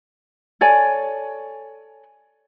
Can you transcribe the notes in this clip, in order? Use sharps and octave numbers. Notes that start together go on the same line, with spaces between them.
A4 C#5 D5 G#5